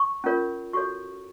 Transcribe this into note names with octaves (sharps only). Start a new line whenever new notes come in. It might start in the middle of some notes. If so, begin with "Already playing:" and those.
Already playing: C#6
C#4 F4 A#4 C#5
F#4 A4 C#5 C#6